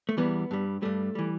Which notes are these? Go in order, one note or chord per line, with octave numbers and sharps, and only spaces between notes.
A3
E2 E3 G3 B3
G2 G3
G2 G3 A3
E3 G3